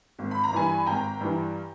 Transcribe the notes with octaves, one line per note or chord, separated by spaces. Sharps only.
G#1
B5
A#5
G2 E3 G#5 B5
G#1 G5 A#5
G2 E3